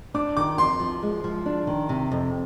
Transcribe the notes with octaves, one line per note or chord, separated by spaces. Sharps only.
D4 D6
D#3 D6
F2 C6
F3
G#3
F3
D4
D#3
C3
F2